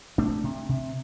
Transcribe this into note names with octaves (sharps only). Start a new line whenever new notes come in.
C3 A3 D4
C3
C3